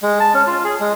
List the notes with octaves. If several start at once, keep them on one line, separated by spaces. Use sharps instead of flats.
G#3
A5
C#4
F4
G#4
G#3